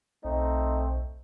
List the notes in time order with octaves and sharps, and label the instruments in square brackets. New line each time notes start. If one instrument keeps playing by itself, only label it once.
[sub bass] B1 [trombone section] A3 C4 D#4